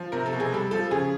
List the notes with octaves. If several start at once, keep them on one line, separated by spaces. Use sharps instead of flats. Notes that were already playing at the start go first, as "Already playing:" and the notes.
Already playing: F3
C3 A#4
A4
B2
G#4
G3 A4
F3 A4
C#3 G#4